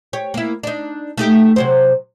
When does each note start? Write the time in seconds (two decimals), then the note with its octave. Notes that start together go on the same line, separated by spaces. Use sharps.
0.13 G4 C#5
0.34 A#3 E4
0.63 D4 D#4
1.18 A3 D#4 G4
1.56 C3 F#3 C5